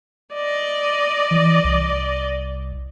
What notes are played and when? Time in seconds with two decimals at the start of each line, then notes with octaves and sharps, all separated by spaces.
0.34 D5 D#5
1.31 E3
1.64 C2